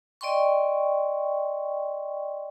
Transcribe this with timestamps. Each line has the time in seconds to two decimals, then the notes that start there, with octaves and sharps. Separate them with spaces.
0.21 D5 D#5 G5 C6 C#6